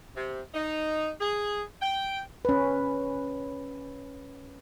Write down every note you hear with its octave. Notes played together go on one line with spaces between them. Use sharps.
C3
D#4
G#4
G5
C#4 B4